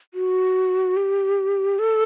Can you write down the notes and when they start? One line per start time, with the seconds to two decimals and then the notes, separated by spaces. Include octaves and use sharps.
0.14 F#4
0.97 G4
1.79 A4